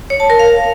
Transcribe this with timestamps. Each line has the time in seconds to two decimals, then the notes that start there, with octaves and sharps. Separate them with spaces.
0.10 C#5
0.20 A5
0.30 A#4
0.39 F5